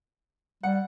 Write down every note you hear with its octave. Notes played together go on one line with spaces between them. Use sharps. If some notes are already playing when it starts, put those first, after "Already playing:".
G3 F#5